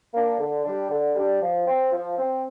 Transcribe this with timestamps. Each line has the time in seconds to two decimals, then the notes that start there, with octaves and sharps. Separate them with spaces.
0.13 A#3 D4
0.39 D3
0.65 G3 D4
0.90 D3
1.15 G3 D4
1.41 F3
1.66 C4
1.92 F3
2.17 C4